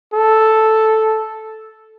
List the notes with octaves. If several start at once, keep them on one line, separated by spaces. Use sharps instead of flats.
A4